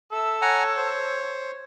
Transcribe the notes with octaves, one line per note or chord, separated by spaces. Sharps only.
A4 E5 E6
C#5 F#5 G#5 A#5
C5